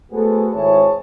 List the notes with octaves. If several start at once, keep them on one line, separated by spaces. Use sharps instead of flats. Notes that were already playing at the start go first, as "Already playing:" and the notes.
A3 B3 F#4 G#4 A4 C5
G#1 C4 E4 G#4 C#5 A5